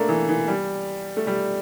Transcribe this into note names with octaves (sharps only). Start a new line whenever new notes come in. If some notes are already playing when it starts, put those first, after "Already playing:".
Already playing: A3 A#3 D4
E3
E3
G3
A3
G3